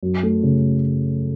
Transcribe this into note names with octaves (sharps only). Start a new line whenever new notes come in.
F#2
A3
C#3